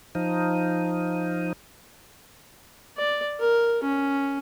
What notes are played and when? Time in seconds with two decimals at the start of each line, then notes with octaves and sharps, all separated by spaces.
0.15 F3 D#4
2.97 D5
3.40 A#4
3.83 C#4